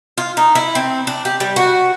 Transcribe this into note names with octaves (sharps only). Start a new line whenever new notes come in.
F4
D#4
E4
C4
D4
G4
G3
F#4